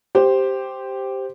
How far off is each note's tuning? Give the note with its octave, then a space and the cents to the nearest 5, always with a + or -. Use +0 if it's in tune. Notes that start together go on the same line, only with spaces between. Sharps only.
G4 -5 C5 +0